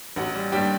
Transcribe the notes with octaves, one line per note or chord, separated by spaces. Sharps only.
A1 F#4
G3
G2 G3 G4